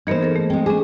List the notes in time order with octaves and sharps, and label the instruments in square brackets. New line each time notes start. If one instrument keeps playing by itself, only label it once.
[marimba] E3 A#3 B3 [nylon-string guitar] D#4 A#4 C5
[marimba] G#4 A4 A#6
A3
[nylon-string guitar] G#3 C4 [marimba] G#4 G5
[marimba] C#4 D6 [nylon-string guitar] G#4